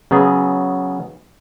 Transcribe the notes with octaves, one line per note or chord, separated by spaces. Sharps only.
C#3 F#3 B3 G#4